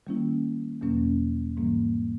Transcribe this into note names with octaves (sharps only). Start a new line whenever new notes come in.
D#3 G3 A#3 C#4 E4
E2 B2 F#3 A#3 C#4
G#2 E3 G3 A#3